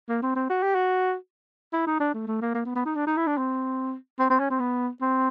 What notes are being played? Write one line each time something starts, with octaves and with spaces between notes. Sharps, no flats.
A#3
C4
C4
F#4
G4
F#4
E4
D#4
D4
A3
A3
A#3
A#3
B3
B3
D#4
D4
D#4
E4
D4
C4
C4
C4
C#4
C4
B3
C4